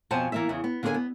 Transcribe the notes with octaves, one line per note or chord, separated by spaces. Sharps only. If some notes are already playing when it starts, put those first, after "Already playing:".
F2 B2 C5 F#5 G#5 A5
E3 A#3 E5
E2 C#3
B3
D3 A#3 G#4 C#5 G#5
B3